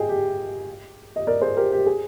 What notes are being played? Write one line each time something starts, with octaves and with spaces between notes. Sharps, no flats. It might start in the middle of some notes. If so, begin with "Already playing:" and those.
Already playing: G#4 D#5 G5
G4
D#5
A#4 D5
G#4 C5
G4 A#4
G4
G#4